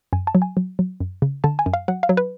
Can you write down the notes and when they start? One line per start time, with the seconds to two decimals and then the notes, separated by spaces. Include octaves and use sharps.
0.13 F#2 G#5
0.27 A5
0.35 F#3
0.42 G#5
0.57 F#3
0.79 F#3
1.00 F#2
1.22 C#3
1.44 D3 A5
1.59 G#5
1.66 F#2
1.74 F5
1.88 F#3 F#5
2.03 F5
2.09 F#3
2.17 B4